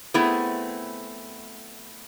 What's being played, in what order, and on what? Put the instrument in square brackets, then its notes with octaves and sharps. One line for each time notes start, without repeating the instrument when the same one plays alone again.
[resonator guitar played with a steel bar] A3 B3 C4 E4 G#4